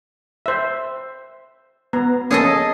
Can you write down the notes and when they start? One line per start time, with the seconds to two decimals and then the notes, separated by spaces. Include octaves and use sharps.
0.46 C5 E5
1.93 B3 A#5
2.31 A#3 C#4 G#4 A4 D#5